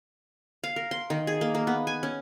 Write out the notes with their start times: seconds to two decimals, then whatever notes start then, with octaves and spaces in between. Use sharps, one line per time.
0.64 F5
0.76 A#4
0.91 C6
1.10 D#3
1.27 G#4
1.41 A#3
1.55 A#3
1.67 B3
1.87 G#5
2.03 C#4